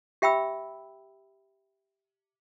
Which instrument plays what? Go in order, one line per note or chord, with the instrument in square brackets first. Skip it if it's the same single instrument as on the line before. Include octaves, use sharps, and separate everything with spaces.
[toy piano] G4 E5 G5 B5 E6